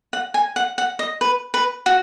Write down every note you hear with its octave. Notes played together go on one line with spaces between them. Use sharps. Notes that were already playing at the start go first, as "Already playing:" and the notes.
F#5
G#5
F#5
F#5
D#5
B4
B4
F#4